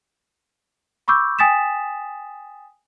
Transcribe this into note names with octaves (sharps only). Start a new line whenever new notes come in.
B5 C#6 D6 E6 G6
G5 G#5 D#6 A6 B6 E7